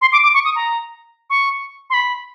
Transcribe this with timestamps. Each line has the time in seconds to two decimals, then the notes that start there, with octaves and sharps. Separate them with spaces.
0.01 C6
0.12 D6
0.23 D6
0.34 C#6
0.45 D#6
0.56 A#5
1.30 C#6
1.90 C6
1.94 B5